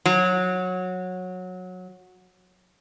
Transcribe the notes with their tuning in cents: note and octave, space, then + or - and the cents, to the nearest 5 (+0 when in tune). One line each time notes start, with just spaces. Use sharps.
F#3 -15